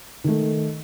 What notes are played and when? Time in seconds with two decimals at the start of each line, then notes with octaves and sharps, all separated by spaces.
0.24 D#3 A3